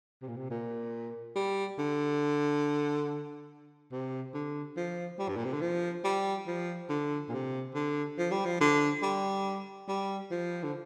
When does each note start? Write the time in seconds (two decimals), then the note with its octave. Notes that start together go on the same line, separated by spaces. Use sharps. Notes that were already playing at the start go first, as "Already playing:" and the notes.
0.22 C3
0.28 A#2
0.37 C3
0.51 A#2
1.36 G3
1.78 D3
3.92 C3
4.33 D3
4.76 F3
5.19 G3
5.29 G2
5.36 A#2
5.45 C3
5.53 D3
5.61 F3
6.04 G3
6.47 F3
6.89 D3
7.29 A#2
7.32 C3
7.74 D3
8.18 F3
8.31 G3
8.45 F3
8.61 D3
9.02 G3
9.88 G3
10.31 F3
10.63 D3